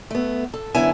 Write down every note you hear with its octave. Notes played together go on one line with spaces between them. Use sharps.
A3 B3
A4
F#2 D3 B3 E4 E5 G#5